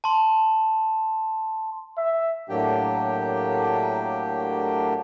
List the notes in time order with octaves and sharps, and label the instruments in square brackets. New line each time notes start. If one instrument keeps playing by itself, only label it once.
[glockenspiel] A5 C6
[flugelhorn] E5
[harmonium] A2 F#3 A#3 D4 G4 G5